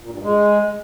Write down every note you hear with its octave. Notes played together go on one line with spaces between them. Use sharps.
A#2
G2
G#3